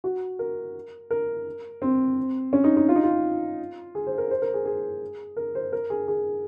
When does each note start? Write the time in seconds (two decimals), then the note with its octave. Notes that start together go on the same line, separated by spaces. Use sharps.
0.04 F#4
0.39 A#4
1.11 A#4
1.82 C4
2.53 C#4
2.64 D#4
2.77 D#4
2.89 F4
2.96 D#4
3.03 F4
3.95 G#4
4.07 C5
4.18 A#4
4.31 C5
4.42 A#4
4.54 G#4
4.66 G#4
5.37 A#4
5.55 C5
5.73 A#4
5.90 G#4
6.08 G#4